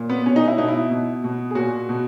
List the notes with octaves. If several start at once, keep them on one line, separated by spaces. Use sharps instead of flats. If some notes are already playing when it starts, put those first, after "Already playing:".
Already playing: A#2
B3
B2 C#4
D#4
E4
B2 D#4
E4
B2
B2
G#4
A#2 F#4
B2